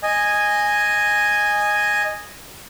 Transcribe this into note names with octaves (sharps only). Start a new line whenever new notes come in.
D#5 G#5